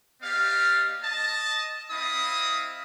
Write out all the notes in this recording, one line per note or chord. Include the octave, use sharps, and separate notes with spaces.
B3 G4 D5 D#5 F5
D#5 A5
C4 E4 D#5 F5 B5 D#6